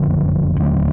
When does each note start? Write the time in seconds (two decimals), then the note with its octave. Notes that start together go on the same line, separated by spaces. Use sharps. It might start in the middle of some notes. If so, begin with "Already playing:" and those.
Already playing: F#1 F2 D3 F3
0.60 D#2 D3 F#3 A3